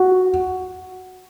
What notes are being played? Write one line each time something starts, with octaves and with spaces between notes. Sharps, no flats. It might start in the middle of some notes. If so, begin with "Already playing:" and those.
Already playing: F#4